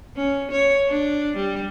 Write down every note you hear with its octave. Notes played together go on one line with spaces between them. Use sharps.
C#4
C#5
D4
G3